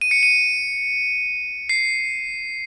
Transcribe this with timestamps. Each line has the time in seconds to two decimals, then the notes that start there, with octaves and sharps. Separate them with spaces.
0.01 D#7
0.11 C#7
0.23 D#7
1.69 C7